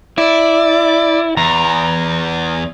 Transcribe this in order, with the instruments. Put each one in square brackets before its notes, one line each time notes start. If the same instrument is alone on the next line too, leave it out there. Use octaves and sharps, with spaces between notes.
[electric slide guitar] E4 [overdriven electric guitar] D5
[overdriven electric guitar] E2 [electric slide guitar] A#5